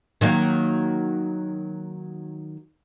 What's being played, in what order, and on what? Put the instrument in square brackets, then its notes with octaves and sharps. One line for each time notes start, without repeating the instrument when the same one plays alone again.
[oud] D#3 F#3 A#3